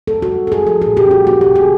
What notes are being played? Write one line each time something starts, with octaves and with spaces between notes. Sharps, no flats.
C4 A4
F#4
G3
C4 G#4 A4
F3 A4
A#2 G#4
G4
C#4 F#4
A#3 F#4
G4
C#3
G#4